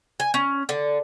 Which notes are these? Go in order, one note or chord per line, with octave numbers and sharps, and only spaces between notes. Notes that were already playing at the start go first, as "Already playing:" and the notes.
G#5
C#4
D3